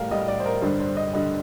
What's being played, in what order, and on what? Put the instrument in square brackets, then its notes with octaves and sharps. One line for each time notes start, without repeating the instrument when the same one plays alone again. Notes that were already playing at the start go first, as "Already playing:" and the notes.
Already playing: [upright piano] A2 G3 A#4 F5
A2 G3 D#5
D5
C5
A#4
G2 D3 G3 C5
C5
D#5
D3 G3 D#5